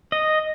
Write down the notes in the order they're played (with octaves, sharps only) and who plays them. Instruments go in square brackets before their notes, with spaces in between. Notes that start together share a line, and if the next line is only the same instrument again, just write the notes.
[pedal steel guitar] D#5